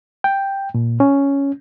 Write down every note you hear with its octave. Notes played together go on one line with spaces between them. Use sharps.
G5
A#2
C#4